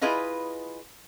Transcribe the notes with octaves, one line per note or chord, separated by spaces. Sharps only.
E4 F4 G#4 B4 D#5 F5